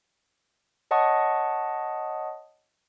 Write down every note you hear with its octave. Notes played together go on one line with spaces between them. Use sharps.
C#5 D#5 F#5 A5 C#6 D#6